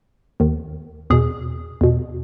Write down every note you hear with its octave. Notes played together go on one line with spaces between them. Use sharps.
D#2 D#3
E2 B2 G#4
E2 B2